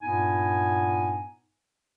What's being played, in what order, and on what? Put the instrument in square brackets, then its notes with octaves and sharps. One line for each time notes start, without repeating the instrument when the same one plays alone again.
[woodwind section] G2 A#2 B3 D#4 G#5